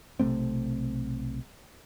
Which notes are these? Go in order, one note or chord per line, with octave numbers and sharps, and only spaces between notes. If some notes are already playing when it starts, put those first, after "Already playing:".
B1 C3 A3 C4